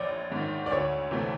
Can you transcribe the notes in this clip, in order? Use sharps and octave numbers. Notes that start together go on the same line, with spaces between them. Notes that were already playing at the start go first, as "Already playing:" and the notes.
Already playing: A#1 C#5 D5
G#2 D#3
D5
D2 C#5
C3 E3 A3 C4